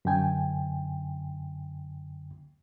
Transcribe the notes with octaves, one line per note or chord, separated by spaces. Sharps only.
F#2 D3 G5 G#5